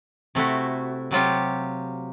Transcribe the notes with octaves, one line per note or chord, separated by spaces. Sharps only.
C3 A3 E4 F#4
C3 F#3 F4 G4